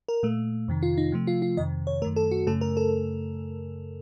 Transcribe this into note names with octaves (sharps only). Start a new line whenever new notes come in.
A#4
A#2 A3
F2 C3 D#3
F4
D#4
C3 F3 A3
F4
F4
F2 C3 D#3 D#5
C#5
F#2 D#3 A3 A#4
A4
F#4
F#2 C#3 A3 A4
A#4
A4